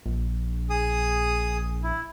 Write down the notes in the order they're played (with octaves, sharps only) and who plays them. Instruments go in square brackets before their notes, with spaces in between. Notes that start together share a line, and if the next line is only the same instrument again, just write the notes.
[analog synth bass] A#1
[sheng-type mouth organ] G#4 D#6
E4